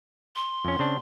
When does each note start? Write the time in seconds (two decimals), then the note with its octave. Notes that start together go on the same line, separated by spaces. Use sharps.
0.36 C6
0.65 F2 C#4
0.79 C#3 C4 D4